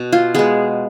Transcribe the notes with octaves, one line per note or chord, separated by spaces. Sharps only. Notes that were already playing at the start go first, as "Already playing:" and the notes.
Already playing: B2
F4
G#3 B3 G#4